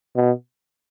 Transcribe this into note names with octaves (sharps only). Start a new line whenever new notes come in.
B2